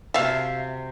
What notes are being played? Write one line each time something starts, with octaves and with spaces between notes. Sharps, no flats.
C3 F#4 E5 F5 A5